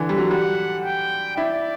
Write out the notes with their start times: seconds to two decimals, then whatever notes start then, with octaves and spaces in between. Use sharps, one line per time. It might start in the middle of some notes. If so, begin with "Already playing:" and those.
Already playing: D3 E3
0.09 G3
0.18 F#3
0.30 G3 F#5
0.85 G5
1.37 E4 D5